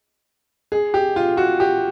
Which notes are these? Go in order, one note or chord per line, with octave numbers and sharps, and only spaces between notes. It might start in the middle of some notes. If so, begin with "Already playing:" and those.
G#4
G4
F4
F#4
G4